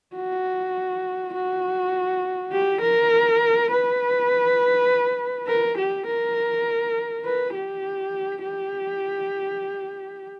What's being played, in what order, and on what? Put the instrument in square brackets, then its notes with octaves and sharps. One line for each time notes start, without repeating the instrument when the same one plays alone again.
[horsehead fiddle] F#4
F#4
G4
A#4
B4
A#4
G4
A#4
B4
G4
G4